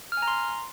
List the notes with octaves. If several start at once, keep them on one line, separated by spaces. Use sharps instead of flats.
F6
G#5
A#5
C6